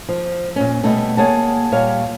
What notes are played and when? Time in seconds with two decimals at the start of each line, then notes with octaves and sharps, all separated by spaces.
0.09 F3
0.56 A#2 C#4
0.83 B2 G3 A3 A4
1.17 A#3 G#4 C#5 F#5 A5
1.72 A#2 G3 C#5 F5